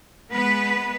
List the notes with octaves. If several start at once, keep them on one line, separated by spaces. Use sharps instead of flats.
G#3 B3 B4